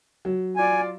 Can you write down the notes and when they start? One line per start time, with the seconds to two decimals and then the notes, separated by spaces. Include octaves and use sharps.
0.25 F#3
0.57 F4 D5 G#5